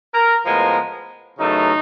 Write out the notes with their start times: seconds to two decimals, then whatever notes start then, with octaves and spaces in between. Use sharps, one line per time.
0.14 A#4
0.45 A2 F3 G#3 B3 A#4
1.39 F#2 C#3 E3 A3 D#4